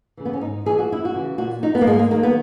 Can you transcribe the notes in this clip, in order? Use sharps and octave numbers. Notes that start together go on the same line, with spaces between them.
C#3 E3
B3
C#4
G#2 D#4
E3 G#4
F#4
F#2 E4
F#4
C#3 E3
A#2 F#4
F#3 D#4
B3
A#3
G#2 G#3
A#3
D#3 F#3 A#3
B3